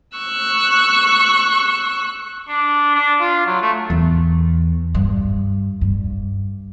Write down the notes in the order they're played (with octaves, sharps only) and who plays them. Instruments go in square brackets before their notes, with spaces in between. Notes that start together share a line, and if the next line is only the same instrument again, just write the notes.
[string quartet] C#6 E6 F#6
[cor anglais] D4
D4
F4
F#3
A3
[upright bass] E2
G2
G2